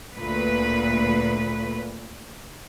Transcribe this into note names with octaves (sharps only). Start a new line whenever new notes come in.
D2 A#2 B4